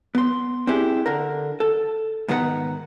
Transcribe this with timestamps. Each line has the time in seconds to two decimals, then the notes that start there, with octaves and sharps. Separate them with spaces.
0.15 B3 C6
0.67 C4 D4 E4 G4 G#4
1.06 D3 A#4
1.60 A4
2.28 G#2 D#3 B3 G#4 F#5 A#5